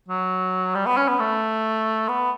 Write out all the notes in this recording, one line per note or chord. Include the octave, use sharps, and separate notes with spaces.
F#3
G3
B3
C#4
B3
A3
B3